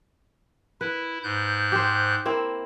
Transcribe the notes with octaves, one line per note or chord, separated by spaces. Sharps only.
E4 B4
G#2 F#6 G6
G4 C5
A#3 C4 E4